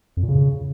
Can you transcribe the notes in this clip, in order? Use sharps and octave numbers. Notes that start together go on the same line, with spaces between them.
F2
A#2
C#3